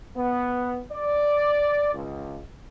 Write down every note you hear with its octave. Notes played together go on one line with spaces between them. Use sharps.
B3
D5
C#2